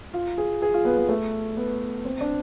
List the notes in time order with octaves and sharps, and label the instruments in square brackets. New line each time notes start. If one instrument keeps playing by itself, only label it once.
[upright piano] F4
G#4
G#4
F4
B3
B3
A3
B3
C4
D4